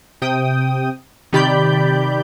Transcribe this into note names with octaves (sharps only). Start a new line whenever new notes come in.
C3 G5 D#6
C3 D#3 G4 D5 B5 G6